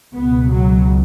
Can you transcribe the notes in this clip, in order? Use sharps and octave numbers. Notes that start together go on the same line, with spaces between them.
C#2 B2 B3
F#3